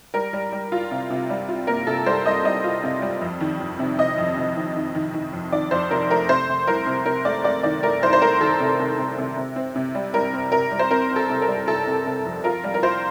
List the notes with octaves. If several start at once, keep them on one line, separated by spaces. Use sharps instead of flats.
G3 A#4
G3
G3
F4
C3
C3
G3
F4
A#3 A#4
C3 A4
G3 C5
G3 D#5
G3 D#5
F4
C3
G3
F2
D#3
F2
C3
C3 D#5
F2
C3
D#3
D#3
D#3
D#3
F2
D#3 D5
F2 C5
C3 A#4
A3 A#4
C3 C5
C3
C2 A#4
C3
C3 A#4
A3 D5
A3 D5
D#3 D5
A3 A#4
C2 C5
C5
A3 A#4
D#3 A4
C3
C3
C3
C3
C3
C4
C3
G3
G3 A#4
C4
C3 A#4
G3
C5
C4 A#4
C4
A4
C3
A#4
G3
C3 A4
C3
C3
F2
F4 A#4
G3
A#4
F4 C5